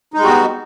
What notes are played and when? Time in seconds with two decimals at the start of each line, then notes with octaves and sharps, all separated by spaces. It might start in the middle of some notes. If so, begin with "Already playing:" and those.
0.14 D#4
0.17 G#3
0.21 G3
0.24 F#4
0.28 B3